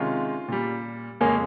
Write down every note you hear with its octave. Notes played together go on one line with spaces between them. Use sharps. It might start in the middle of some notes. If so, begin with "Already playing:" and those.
Already playing: C3 D#3 G#3 C#4 F4
A#2 G3
F2 C#3 G#3 A#3 C#4